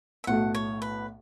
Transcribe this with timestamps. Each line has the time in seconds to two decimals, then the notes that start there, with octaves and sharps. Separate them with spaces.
0.24 E5
0.27 B1 A2 A3 F#4 F#5
0.55 C#5
0.82 B4